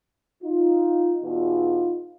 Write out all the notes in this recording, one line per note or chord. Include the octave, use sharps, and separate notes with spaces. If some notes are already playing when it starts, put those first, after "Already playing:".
D#4 F4
E2 B2 D#4 F4